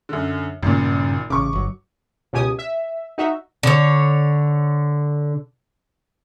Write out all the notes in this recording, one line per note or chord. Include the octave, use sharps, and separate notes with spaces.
F#2 D3
G#1 G2 A#2 C#3 C#4
A1 C#3 C#6 D6
G1 F#3
C#2 B2 G4 G#5 D#6
E5
D#4 F#4 E5
D3 C#5